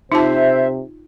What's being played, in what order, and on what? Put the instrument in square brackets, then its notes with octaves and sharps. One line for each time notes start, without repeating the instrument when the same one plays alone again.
[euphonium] C3 [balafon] D#4 F4 A5 [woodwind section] C5 [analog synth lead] E5